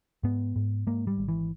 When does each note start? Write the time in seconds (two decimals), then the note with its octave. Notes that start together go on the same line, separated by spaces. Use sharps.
0.23 G#2 B3
0.56 G#2
0.87 G#2 A#3
1.07 G3
1.18 G#1
1.28 E3